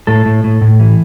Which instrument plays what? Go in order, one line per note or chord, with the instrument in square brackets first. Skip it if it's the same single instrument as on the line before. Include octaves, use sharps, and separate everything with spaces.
[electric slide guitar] A2 A4
A2
A2
A2
E3